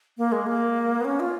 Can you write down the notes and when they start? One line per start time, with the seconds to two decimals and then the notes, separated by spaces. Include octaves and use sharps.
0.18 A#3
0.32 G#3
0.46 A#3
1.00 B3
1.05 C#4
1.20 F4